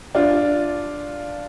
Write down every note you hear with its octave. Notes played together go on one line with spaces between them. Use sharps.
D4 F4